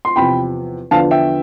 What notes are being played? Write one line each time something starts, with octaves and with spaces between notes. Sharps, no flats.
C6
E2 C3 F3 C4 G5 B5
E2 D3 F3 B3 F5 A5
E5 G5